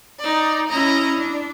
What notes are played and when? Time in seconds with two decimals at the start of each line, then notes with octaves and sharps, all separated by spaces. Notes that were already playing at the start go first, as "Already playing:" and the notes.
0.20 D#4 D5
0.69 C#4 E4 D#5 A#5
1.19 D4